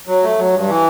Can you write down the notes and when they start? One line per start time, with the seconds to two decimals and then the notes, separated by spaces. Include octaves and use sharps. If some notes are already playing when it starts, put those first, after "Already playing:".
0.07 F#3
0.23 A3
0.38 F#3
0.53 G2
0.68 E3